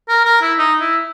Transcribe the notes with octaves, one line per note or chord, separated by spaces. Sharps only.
A#4
A#4
E4
D#4
E4